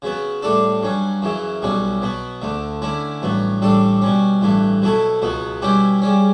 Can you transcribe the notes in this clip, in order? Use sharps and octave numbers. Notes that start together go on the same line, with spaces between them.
C#3 F#3 B3
A2 G3 D4 A4
G2 F#3 C#4
F#2 C#3 E3
B1 B2 G3 C#4
B2 F#3 B3
D2 D3 A3
D3 A3 C#4 E4
A1 G2 F#3 B3
A1 A2 G3 D4 A4
B2 G3 C#4
A1 G2 E3 A3
B2 F#3 A3 E4 A4
C#2 B2 F#3 B3
B2 G3 C#4 E4 G4
C#3 G3 C#4